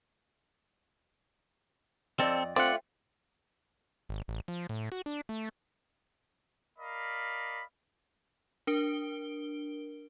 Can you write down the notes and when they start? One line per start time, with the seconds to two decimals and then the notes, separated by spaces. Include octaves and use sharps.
2.20 F2 C4 A4 D5 D#5
2.56 A3 C4 F4 D5 F#5
4.09 G#1
4.28 A1
4.48 F3
4.69 A2
4.92 F#4
5.06 D4
5.29 A3
6.78 A#4 D5 D#5 F5 B5
8.67 D4 A#4 D7 G7